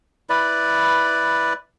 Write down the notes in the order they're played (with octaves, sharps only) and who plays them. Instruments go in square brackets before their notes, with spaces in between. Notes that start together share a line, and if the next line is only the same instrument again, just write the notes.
[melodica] E4 B4 D5